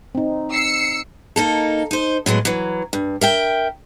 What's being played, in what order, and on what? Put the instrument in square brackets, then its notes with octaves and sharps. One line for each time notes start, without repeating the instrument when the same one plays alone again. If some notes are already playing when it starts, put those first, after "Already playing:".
[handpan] C4 D#4
[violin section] E6 C7 C#7
[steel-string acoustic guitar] A#3 D#4 A4
D#4 C5
A2 F#3 G#3 B3
E3 F#3
G2
A#4 E5 G5